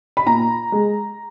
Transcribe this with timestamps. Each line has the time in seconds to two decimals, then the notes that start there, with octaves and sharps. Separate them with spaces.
0.17 B5
0.26 A#2 A#5
0.72 G#3